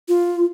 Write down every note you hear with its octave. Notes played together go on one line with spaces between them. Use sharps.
F4